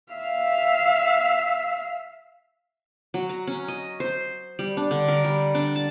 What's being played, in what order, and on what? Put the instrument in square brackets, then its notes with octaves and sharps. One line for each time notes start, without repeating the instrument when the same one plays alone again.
[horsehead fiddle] E5 F5
[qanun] F#3
A#5
C#4
D#5
C5
G3
D4
D3
A#4
G3
D4
A5